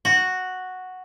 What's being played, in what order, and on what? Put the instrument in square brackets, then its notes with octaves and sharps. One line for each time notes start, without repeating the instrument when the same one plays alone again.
[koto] F#4